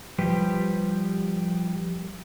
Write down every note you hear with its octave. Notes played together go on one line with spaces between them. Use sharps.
F3 G3 G4 B4